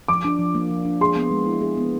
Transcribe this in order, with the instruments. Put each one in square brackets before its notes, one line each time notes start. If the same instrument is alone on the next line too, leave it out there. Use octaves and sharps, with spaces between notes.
[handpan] F3 [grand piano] D6
[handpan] D4
F3
A#3
F3
D4
[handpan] G#4 [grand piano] C6
[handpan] B3
G#3
E4
G#4
B3